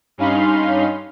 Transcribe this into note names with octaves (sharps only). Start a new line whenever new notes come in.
G2 C#4 D#4 F5 B5 C6